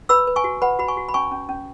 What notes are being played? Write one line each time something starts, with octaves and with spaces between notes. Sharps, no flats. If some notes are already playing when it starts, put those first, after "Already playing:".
B4 B5 E6
B4
G#5 C#6
F#4
B4 F#5 B5
F#4 B5
G#5 C#6
F#4
B5
C#4 G#5 C#6
C#4
C#4